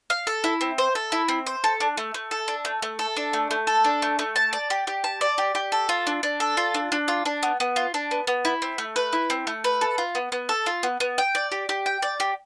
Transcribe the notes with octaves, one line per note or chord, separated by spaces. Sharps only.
F5
A4
E4
C4
C5
A4
E4
C4
C5
A4
D4
A3
A3
A4
D4
A3
A3
A4
D4
A3
A3
A4
D4
A3
A3
A5
D5
G4
G4
A5
D5
G4
G4
A4
F4
D4
D4
A4
F4
D4
D4
F4
D4
B3
B3
F4
D4
B3
B3
E4
C4
A3
B4
E4
C4
A3
B4
A4
F4
B3
B3
A4
F4
B3
B3
G5
D5
G4
G4
G5
D5
G4